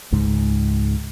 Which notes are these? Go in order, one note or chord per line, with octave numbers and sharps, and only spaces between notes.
C#2 G#2